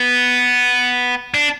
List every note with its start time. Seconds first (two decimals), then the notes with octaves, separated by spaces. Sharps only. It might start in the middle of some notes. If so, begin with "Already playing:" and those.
Already playing: B3
1.34 D4